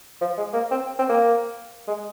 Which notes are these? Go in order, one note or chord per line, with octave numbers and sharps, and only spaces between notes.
F3
G#3
A#3
C4
C4
A#3
G#3